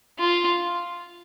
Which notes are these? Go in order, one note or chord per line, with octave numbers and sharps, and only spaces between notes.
F4